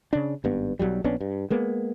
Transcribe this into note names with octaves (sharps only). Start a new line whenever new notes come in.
C#3 D4
G#1 G2 B3
B1 G2 F#3 G3
A#1 B3 C#4 D4
G2
G#3 A#3 B3